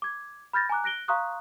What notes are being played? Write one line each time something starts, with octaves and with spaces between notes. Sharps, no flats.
D6 G#6
B5 F6 G6 A6 A#6
G#5 A#5 D6 F#6
F#6 A#6 D7 G7
F5 A#5 C6 C#6 D#6 F#6